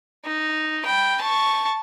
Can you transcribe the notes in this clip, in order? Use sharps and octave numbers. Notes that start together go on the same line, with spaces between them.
D#4
G5 B5
A5 C#6